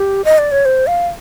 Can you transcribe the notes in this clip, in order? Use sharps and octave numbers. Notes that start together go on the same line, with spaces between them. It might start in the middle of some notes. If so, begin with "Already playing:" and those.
Already playing: G4
D#5
D5
C#5
C5
F5